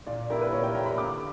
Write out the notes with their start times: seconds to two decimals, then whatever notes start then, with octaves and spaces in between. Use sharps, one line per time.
0.07 A#2 D5
0.30 A#3 E4 G4 A#4
0.41 B4
0.53 A#2 C#5
0.63 G5
0.75 A#3 E4 G4 A#5
0.86 B5
0.98 D3 D6